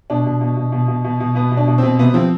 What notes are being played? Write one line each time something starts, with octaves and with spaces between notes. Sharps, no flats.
B2 D4
B2
B2
B2
B2
B2
B2
B2
B2 B3
B2
D4
B2
B2 C4
C3 B3
F3 C4